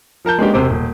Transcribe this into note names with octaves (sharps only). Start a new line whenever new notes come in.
F3 A#4 A5 G6
G#3 A#3 B3 C#4 D4 G4
E1 C3 C5 D6
D#1